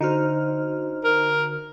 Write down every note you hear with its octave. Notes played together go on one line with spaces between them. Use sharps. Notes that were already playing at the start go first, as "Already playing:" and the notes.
D3 D#4 F#4 C5 F6
A#4